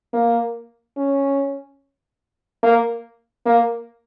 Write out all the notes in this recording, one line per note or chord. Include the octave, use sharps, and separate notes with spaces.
A#3
C#4
A#3
A#3